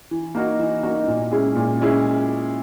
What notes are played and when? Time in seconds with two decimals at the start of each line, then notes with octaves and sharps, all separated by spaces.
0.11 E3
0.35 A#3 D#4 F#4
0.59 E3
0.83 A#3 D#4 F#4
1.07 A#2
1.32 G#3 C#4 E4 G#4
1.56 A#2
1.80 G#3 C#4 E4 G#4